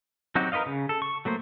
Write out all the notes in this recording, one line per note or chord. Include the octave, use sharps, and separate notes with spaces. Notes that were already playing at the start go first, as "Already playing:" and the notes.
F#3 C4 D#4 F#4 G4
A#4 B4 C#5 D#5 F5
C#3
A4
C#6
F#3 A3 A#3 C5